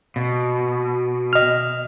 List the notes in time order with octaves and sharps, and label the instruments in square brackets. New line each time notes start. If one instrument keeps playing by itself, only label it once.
[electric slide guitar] B2
[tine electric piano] D#5 F6